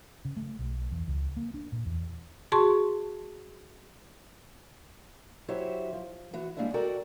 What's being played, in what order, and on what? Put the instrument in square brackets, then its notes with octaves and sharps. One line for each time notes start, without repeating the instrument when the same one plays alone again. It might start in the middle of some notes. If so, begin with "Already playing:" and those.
[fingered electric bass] C#3
A3
B1
E2
C#2
A#3
D4
A#2
E2
[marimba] F#4 G#4 A5 C6 C#6
[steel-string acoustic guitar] F#3 E4 G4 C5 C#5 E5
F3
E3 F#4
G3 G#3 A#3 D4 E4 E5
F#4 A4 A#4 D5 G5